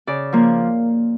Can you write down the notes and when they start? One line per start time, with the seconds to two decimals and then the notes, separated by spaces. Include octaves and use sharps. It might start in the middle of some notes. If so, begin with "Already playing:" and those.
0.07 C#3 D5
0.33 F3 A#3